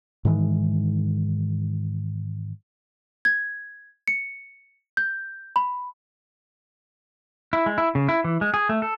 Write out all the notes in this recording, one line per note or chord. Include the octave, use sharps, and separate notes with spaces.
G#2 D#3 E3 G#3
G#6
C#7
G6
B5
E4
G#3
E4
C#3
E4
E3
G#3
G#4
A3
A4